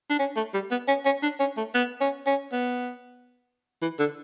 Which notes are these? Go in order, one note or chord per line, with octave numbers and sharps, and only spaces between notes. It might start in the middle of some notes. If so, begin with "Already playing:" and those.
D4
C#4
A3
G3
B3
C#4
C#4
D4
C#4
A3
B3
C#4
C#4
B3
E3
D3